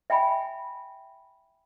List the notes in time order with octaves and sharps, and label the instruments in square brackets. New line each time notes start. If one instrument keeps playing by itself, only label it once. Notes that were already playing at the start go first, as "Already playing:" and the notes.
[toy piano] E5 G5 G#5 B5